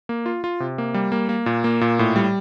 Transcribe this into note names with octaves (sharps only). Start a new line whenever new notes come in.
A#3
F4
F4
C3
A#3
G3
A#3
A#3
A#2
A#3
A#2
A2
G3